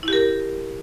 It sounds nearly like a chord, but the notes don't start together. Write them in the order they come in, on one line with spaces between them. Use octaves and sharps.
E4 G4 A#4